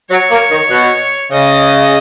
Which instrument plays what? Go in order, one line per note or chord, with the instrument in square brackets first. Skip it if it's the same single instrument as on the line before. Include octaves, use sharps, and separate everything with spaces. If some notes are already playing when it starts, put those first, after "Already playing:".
[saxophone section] F#3 [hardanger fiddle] C#5
[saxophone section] A#3
D#3
B2
[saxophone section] C#3 [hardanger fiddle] D#5